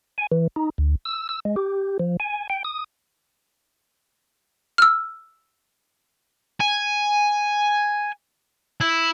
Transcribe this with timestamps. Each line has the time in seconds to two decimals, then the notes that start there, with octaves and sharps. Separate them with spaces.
0.18 G#5
0.32 E3
0.56 D#4
0.78 D2
1.05 E6
1.29 E6
1.45 G#3
1.56 G4
2.00 F3
2.20 G#5
2.50 G5
2.64 D#6
4.78 E6 F6
6.61 G#5
8.81 E4